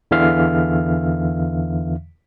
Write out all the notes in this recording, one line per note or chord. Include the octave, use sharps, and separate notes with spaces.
E2 D3 E3 E5 F5 F6